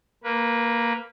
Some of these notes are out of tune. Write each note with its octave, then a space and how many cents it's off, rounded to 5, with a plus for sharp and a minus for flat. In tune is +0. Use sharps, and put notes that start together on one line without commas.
A#3 +0 B4 -20